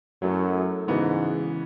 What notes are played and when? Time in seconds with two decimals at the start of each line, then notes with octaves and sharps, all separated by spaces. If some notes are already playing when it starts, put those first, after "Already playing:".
0.22 F#2 F#3 A3 E4 A4
0.87 G#2 C#3 E3 B3 F#4